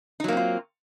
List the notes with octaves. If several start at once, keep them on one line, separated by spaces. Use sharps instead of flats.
F#3 A#3 C4 D#4 F4